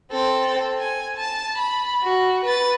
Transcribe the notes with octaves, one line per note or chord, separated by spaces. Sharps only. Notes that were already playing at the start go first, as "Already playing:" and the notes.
C4 A4
G#5
A5
B5
F#4
B4 A6